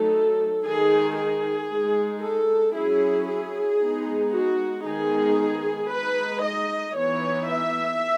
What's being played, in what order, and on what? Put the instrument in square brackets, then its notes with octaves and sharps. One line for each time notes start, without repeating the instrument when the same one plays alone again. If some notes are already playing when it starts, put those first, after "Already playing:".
Already playing: [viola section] F#3 A3 D#4 A4
D#3 G#3 D#4 G#4
G#4
G#3 D#4
A4
F#3 C#4 E4 G#4
G#4
G#3 B3 D#4
F#4
D#3 G#3 B3 D#4 G#4
G#3 D#4 B4
D#5
E3 B3 D#4 C#5
E5